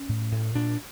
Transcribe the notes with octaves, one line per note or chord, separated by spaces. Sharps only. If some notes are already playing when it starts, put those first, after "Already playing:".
Already playing: C#4
A2
A2
A#2 D4